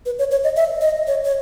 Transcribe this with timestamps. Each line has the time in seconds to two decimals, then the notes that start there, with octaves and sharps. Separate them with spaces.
0.06 B4
0.19 C#5
0.31 C#5
0.44 D#5
0.56 E5
0.81 D#5
1.07 C#5
1.24 C#5